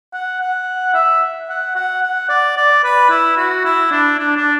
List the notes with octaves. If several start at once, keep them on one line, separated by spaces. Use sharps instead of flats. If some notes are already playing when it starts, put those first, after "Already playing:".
F#5
F#5
E5
F#5
F#5
F#5
D5
D5
B4
E4
F#4
E4
D4
D4
D4